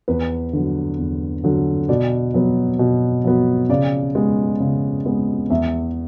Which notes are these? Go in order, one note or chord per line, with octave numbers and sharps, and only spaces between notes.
E2 B4
D3 F#3
E2
D3 F#3
B2 D5
F#3 B3
B2
F#3 B3
C#3 D5
G#3 B3
C#3
G#3 B3
E2 E5